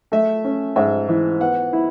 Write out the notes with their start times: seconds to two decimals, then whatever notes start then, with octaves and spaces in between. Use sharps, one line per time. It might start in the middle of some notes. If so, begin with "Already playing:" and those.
0.12 A3 E5
0.44 C#4
0.76 G#2 E5
1.09 E3
1.40 B3 F#5
1.73 E4